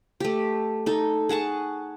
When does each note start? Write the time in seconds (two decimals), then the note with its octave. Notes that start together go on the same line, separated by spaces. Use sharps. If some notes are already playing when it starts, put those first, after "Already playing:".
0.20 A3 G4
0.86 D#4 A4
1.29 G#4 F#5 A5 C#6